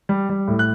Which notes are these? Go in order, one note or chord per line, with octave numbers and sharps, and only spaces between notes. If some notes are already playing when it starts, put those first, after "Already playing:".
G3
G3
A2
F#6